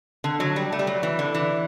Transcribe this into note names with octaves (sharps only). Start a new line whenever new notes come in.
D3
F#3
G3
A3
G3
F#3
E3
D3
E3